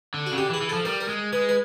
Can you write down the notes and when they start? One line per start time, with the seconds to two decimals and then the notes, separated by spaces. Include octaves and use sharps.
0.14 D3
0.26 F#4
0.32 C#3
0.38 D3 G4
0.50 E3
0.54 G#4
0.61 E3
0.69 F3 A4
0.85 G3 A#4
1.01 A#4
1.09 G#3
1.33 G#3 B4
1.49 B4